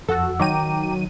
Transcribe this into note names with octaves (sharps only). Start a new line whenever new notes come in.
F2 F#4 A4 F#5 E6
D#3 F#3 G5 A#5 D6 D#7